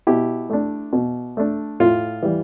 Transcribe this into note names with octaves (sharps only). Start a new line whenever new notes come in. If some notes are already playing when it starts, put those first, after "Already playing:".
B2 E4 G4
A3 D4
B2
A3 D4
A2 F4
E3 G3